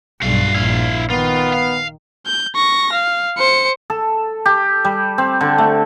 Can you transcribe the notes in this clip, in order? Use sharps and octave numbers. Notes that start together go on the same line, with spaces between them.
B1 G2 F#4 F5
A#1 E4 F5
D#3 B3 F4
F5
G6
C#6 A#6
F5
C5 C#7
A4
G4
G3
C4
D3
A3